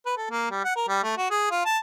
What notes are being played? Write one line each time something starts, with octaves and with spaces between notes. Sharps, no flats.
B4
A4
A#3
G3
F#5
A#4
G3
A3
F#4
G#4
F4
A5